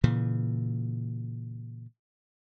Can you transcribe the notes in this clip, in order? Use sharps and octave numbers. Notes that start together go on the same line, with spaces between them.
A#2 C#3 E3